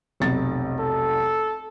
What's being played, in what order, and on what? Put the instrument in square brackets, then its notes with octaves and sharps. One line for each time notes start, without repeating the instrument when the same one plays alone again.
[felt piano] F1 B1 A6
[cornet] A4